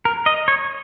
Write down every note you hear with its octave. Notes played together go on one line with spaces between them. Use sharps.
A#4
D#5
C#5